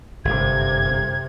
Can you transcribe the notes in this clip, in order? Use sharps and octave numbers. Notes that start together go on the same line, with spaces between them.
G1 F#2 C3 G#6